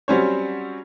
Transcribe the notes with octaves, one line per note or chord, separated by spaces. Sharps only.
F#3 G3 C4 C#4 C5 C#5